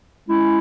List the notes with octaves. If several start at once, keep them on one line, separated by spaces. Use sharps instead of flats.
G#3 C#4 E4